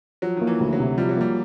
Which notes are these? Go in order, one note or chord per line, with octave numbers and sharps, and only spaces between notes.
F3 F#3
D#3 A#3
E3
D2
F#3
C3
F3 G3
F#3
G3 A#3